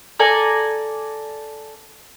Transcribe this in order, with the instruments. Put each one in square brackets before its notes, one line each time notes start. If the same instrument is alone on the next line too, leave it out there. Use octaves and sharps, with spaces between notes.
[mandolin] A4 D5 G#5 A#5